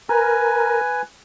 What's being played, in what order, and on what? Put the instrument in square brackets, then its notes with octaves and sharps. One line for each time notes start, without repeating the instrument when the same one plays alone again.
[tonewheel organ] A#4 [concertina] B4 G#5